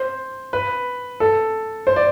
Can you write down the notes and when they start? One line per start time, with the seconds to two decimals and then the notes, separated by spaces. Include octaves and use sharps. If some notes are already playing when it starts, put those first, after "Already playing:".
Already playing: C5
0.53 B4
1.20 A4
1.87 C5
1.96 D5